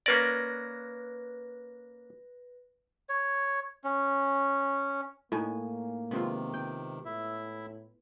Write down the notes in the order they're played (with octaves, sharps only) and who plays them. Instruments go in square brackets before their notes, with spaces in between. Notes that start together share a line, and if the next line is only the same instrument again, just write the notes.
[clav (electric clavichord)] A#3 C#4 D5 [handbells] B4 A#6
[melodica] C#5
C#4
[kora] A2 [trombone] A#3 [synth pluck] D#4 G#5
[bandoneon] C3 D#3 [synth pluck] G#3 C4 F4 [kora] B3
[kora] G5
[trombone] A2 [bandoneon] E4 E5